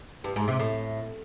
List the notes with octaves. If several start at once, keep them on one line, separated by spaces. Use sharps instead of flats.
G2
G#2
C3
A2